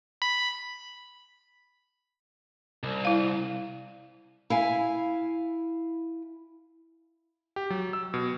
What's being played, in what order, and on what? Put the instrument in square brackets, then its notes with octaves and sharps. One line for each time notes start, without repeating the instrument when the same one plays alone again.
[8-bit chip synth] B5
[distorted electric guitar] C2
[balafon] E4 F5
[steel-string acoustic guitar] E4 F5 G#5
[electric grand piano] G4
F#3
E6
B2